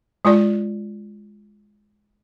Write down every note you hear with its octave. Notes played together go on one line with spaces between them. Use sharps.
G#3 F4 D5